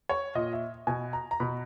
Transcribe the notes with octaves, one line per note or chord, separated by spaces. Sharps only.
C#5
A#2 D#5
E5
B2 G#5
A#5
A#5
B2 B5